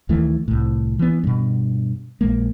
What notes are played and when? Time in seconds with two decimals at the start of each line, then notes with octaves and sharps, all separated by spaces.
0.09 D2 D#3 E3 A3
0.48 C2 A2
0.99 E3 B3
1.24 G2 B2
2.21 A#1 G#3 A#3